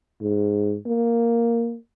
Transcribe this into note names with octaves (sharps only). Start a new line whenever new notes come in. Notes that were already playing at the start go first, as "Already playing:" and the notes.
G#2
A#3